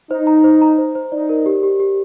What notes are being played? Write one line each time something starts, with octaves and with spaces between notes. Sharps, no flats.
D#4 C5
A#5
C5
A#5
C5
C5
D#4 D5
A#4
G4
G4
G4